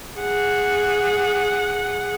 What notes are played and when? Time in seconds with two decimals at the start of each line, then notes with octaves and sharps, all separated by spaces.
0.21 G#4 F#5